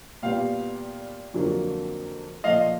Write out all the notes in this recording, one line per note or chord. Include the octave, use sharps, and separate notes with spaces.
A#2 G3 B3 F5 G5
F2 D3 F#3 A#3
A#2 F3 A3 D#5 F5